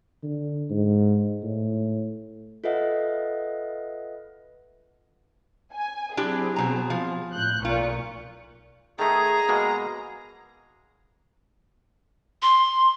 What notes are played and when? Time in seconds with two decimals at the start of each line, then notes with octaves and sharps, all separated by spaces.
0.23 D3
0.70 G#2
1.44 A2
2.64 F4 A4 B4 D#5 E5 F#5
5.74 G#5
6.17 F#3 C4 D4 E4 G4 G#4
6.56 B2 A#5
6.90 F3
7.33 A2 F#6 G6
7.65 B1 A#2 F4 C#6
8.99 D#3 A3 G#4 A#5
9.49 B2 G#3 A#3
12.42 C6